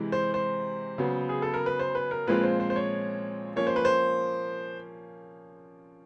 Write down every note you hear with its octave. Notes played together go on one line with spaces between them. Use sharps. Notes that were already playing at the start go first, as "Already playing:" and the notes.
Already playing: C3 E3 G#3
C5
C5
C#3 F#3 B3
G#4
A4
A#4
B4
C5
B4
A#4
A#2 F3 G#3 C4 F4 B4
C5
C5
C5
C#5
F3 A#3 C#4 C#5
C5
B4
C5